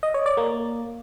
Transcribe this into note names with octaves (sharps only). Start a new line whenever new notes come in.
D#5
C#5
D5
A#3